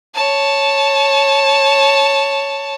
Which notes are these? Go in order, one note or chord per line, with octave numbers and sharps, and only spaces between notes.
C#5 A5